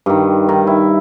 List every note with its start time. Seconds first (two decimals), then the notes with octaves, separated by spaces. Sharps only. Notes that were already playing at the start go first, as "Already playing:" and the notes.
0.06 G2 D#3
0.49 D#3
0.67 E4